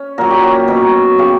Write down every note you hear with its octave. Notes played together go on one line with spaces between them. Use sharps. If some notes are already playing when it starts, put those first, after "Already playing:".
Already playing: C#4
A#2 F#3 A#4
G4
F#4
B2 F#3 A#4
C#3 F#3 G4